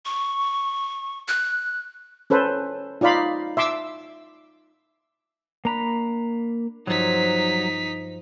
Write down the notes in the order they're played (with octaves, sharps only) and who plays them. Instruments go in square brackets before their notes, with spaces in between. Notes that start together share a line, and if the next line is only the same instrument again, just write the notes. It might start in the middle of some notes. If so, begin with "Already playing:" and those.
[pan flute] C#6
F#6
[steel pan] C#4 A4 B4 C5
D#4 F4 D5 F5 B5 C6
E5 C6 D6 E6
[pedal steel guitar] A#3 A#5 B5 [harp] D4
[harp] G2 F3 C5 [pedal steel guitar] F#3 [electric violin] D#4 B6